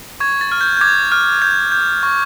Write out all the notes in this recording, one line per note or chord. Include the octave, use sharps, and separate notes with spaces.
C#6 G#6
A6
F6
G6
G6
D6 G#6
F6
G6
G6
C#6